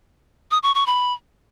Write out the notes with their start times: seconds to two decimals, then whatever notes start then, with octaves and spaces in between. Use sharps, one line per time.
0.51 D#6
0.63 C#6
0.75 C#6
0.86 B5